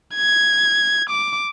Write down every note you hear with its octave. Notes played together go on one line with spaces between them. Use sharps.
G#6
D6